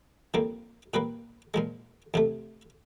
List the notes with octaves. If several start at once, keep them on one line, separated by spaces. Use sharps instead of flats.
F2 D3 G3 A#3
A#2 G3 A#3 B4
A#2 F3 G#3
F2 C3 F3 A3